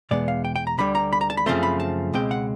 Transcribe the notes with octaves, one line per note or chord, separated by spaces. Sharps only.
E2 B2 G#3 B3 D5
F5
G5
G5
A#5
D2 D3 G3 B5
A#5
B5
A#5
A5
B5
F#2 C#3 F3 A3 C4 C6
B5
A5
C#2 B2 G#3 C4 G5
F#5